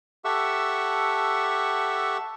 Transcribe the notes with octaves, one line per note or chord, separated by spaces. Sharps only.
G4 A4 E5 F#5 C#6 E6